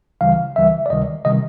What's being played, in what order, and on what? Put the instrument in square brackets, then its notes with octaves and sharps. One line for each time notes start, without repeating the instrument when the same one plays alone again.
[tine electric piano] C#2 C#3 E3 G3 F5
C#2 C#3 E3 G3 E5
D5
C#2 C3 D#3 G3 D#5
C3 D#3 G3 D#5